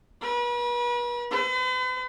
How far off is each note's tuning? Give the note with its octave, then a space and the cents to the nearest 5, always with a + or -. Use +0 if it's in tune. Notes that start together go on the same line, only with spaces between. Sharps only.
B4 -40
B4 +45